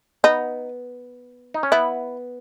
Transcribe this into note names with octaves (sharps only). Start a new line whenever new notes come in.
B3 D#4
D#4
C#4
B3 E4